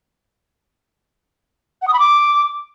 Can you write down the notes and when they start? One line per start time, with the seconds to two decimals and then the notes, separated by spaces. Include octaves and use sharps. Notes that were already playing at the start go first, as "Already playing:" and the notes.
1.82 F#5
1.88 D#6
1.93 B5
1.99 D6